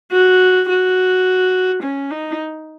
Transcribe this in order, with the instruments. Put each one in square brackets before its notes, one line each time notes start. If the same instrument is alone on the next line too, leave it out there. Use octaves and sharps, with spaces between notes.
[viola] F#4
F#4
C#4
D#4